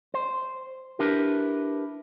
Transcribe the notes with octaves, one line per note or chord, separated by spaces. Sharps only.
C5
D4 E4 G4 A#4 B4